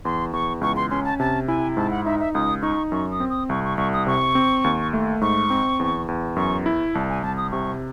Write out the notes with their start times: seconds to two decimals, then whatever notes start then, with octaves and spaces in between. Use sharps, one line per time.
0.05 E2 C6
0.33 E2 C#6
0.61 C#2 C#6
0.76 C6
0.90 C#4 C6
1.04 A5
1.19 C3 A5
1.48 E4 G#5
1.77 G#2 A5
1.91 F#5
2.05 D#4 E5
2.20 E5
2.34 C#2 D#6
2.63 D#4 C#6
2.92 F#2 C#6
3.11 D#6
3.20 C4
3.30 D#6
3.49 C2 C#6
3.64 C#6
3.78 C2 C#6
3.93 D#6
4.07 C3 C#6
4.35 C4
4.64 D#2
4.93 A3
5.21 G#2 C#6
5.50 C4
5.80 E2
6.08 E2
6.36 F#2 C#6
6.66 E4
6.94 C2 A5
7.09 G#5
7.23 C2 A5
7.37 D#6
7.51 C3 C#6